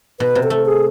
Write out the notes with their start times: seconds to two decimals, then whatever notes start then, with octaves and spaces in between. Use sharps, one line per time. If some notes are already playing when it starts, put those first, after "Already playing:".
0.20 B2 B4
0.35 C3
0.43 A4
0.50 A3
0.66 G#4